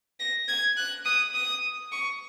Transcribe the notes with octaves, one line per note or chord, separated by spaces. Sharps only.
A#6
G#6
F#6
D#6
D#6
C#6